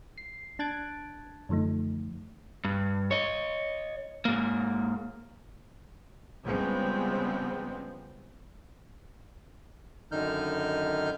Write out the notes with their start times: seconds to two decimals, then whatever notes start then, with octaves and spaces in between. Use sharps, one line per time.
0.18 C7
0.59 D4 A5 F#6 G#6 A6 D7
1.49 F#2 D3 F3 A3 D#4
2.65 G2
3.11 C#5 D#5
4.25 G#2 A#3
6.44 C#3 F3 G3 G#3 B3 C4
10.12 F#2 D3 D#3 D#4 F6 G6